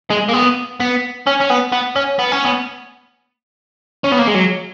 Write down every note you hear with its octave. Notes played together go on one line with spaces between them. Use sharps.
G#3
A#3
B3
B3
C#4
C#4
B3
B3
C#4
B3
C#4
B3
C#4
B3
A#3
G#3
F#3